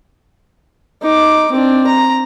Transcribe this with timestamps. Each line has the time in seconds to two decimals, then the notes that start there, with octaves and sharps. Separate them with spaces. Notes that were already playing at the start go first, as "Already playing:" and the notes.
1.02 D#4 D6
1.52 C4 D4
1.87 A#5